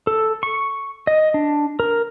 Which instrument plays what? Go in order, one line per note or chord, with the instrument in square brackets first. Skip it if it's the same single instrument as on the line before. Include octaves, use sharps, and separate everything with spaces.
[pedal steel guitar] A4
C#6
D#5
D4
A#4